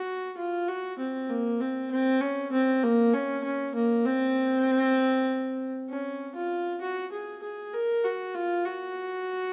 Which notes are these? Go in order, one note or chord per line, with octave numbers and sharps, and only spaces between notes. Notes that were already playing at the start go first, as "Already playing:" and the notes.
Already playing: F#4
F4
F#4
C4
A#3
C4
C4
C#4
C4
A#3
C#4
C#4
A#3
C4
C#4
F4
F#4
G#4
G#4
A#4
F#4
F4
F#4